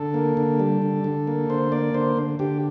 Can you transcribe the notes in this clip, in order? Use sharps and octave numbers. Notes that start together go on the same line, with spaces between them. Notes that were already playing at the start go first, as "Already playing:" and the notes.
Already playing: D3 A4
A#3
D3
G3
D3
D3
A#3
D3 C5
A#3 D5
D3 C5
D3
D3 G4